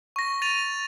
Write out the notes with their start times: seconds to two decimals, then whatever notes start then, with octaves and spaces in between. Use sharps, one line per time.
0.16 C#6 A#6
0.42 A6 D#7 F7